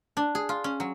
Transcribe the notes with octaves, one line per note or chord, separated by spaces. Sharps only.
D4
G#4
F4
C#4
F#3